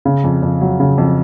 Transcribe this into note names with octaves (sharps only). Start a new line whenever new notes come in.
C#3
F2
F2
F#3
C#3
F2